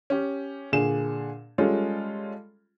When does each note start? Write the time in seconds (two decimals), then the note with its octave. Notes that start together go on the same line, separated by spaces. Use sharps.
0.10 C#4 G4
0.72 A#2 D3 G#4 E7
1.58 G3 G#3 C#4 F4 G#4 A4